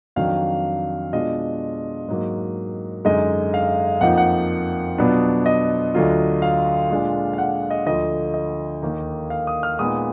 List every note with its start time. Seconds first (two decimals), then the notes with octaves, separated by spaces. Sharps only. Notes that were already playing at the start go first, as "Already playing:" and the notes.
0.16 F2 D#3 F#3 D4 F5
1.12 B2 G#3 D4 F4 D#5
2.08 G#2 F#3 A#3
3.05 F#2 D3 G#3 D#4 D#5
3.54 F5
4.01 F2 F3 A#3 D#4 F#5
4.18 F#5
4.98 B2 F#3 B3 D4 F4
5.46 D#5
5.94 D2 D3 F#3 D4 F4
6.42 F5
6.90 A#2 G#3 D4 F4
7.33 F5
7.38 F#5
7.71 D#5
7.86 D2 D3 F3 D#5
8.34 D#5
8.82 D#2 D#3 A#3 D#4
9.30 F5
9.47 D#6
9.63 F6
9.79 A#2 G#3 B3 D#4 D#6